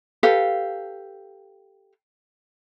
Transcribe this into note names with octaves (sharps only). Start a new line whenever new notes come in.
G4 A4 B4 F5